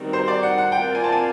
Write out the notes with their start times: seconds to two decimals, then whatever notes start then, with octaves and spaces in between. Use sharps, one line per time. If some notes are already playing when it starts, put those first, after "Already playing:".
Already playing: D#3 G3 C4 D#4 F#4
0.13 C5
0.28 D5
0.43 F#5
0.58 F#5
0.72 C4 F4 A#4 D5 G5
0.95 G#5
1.04 A5
1.12 G#5